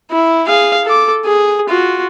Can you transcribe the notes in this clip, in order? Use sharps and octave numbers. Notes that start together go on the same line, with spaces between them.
E4
G#4 F5
A4 D6
G#4
F4 F#4